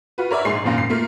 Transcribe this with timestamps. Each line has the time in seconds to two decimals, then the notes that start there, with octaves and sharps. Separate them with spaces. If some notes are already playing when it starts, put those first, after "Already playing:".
0.18 F4 F#4 B4
0.31 A#4 C#5 D5 E5
0.45 A#1 G#2 G#4 C6 C7
0.64 G#1 F#2 A#2 F5 A#6
0.78 C7
0.90 A3 A#3 F4